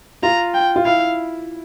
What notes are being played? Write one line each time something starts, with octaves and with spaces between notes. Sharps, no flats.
F4 A#5
G5
F4
E4 F5